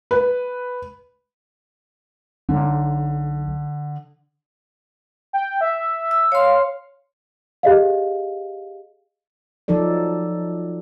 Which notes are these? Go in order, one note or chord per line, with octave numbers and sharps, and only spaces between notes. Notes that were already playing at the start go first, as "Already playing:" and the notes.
B4
B1 D3
G5
E5
E6
C#5 F5 C6
G4 G#4 D#5 F5
F3 F#3 D#4 A4 D5